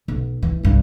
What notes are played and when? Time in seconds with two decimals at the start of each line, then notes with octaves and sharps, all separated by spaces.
0.08 B1
0.42 E3
0.63 C2 G2